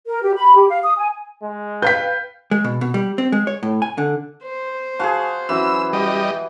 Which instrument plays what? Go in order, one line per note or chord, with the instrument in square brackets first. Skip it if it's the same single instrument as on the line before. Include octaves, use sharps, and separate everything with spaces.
[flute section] A#4
G4
B5
G4
F5
D#6
G#5
[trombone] G#3
[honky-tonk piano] B4 F5 G5 [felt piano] G6 B6
[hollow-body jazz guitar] G#3
B2
B2
G3
C4
G#3
C#5
A2
G#5
D3
[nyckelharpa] C5
[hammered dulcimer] F#4 G#4 [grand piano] F5 G#5 A5
[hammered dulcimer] E3 [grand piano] F#3 C#4 F#4 [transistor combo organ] E6
[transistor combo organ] G3 D#5